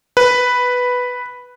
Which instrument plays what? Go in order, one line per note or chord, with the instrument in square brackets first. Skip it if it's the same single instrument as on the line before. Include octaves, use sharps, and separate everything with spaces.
[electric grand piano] B4